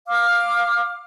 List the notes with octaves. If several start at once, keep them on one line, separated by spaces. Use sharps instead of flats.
F5 D6 F6